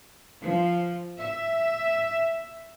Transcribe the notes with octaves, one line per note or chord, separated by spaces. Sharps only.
F3
E5